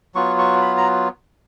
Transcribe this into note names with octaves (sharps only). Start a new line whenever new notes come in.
F#3 B3 F4 C#6
C#6
B5
A#5